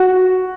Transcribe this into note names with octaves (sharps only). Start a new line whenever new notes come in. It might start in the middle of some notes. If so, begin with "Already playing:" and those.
Already playing: F#4